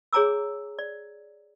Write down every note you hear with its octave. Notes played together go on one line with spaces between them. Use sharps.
G#4 C#5 G#5 A#5 D6 E6
D5